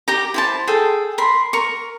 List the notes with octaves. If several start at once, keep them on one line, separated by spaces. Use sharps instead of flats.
G4 A#5
E4 C5 A5
G#4 A4 G5
A#4 B5 C6
A#4 C#6